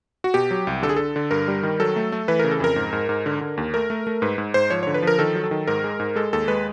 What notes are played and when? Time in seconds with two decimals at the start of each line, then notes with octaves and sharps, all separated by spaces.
0.24 F#4
0.34 B2 G4
0.51 F#3
0.67 C2
0.83 D3 A4
0.89 G#4
0.96 D3 A4
1.16 D3
1.31 G2 A#4
1.48 G3
1.63 D#3
1.80 F#3 A4
1.96 A3
2.12 A3
2.28 E3 B4
2.39 C#3 A#4
2.51 A4
2.60 F2 A#4
2.76 G#2
2.93 G#2
3.09 G#2
3.26 D3
3.41 D3
3.57 D#2
3.74 A3 A#4
3.90 A3
4.07 A3
4.22 G#2 B4
4.38 G#2
4.54 G#2 C5
4.70 F3 C#5
4.83 D3 C#5
4.94 B4
5.02 F3 A#4
5.19 D#3 A4
5.35 F#3
5.44 A4
5.51 D#3
5.68 G#2 A#4
5.84 G#3
6.00 G#2
6.16 G#3 A4
6.33 D#2 A4
6.48 G#3 B4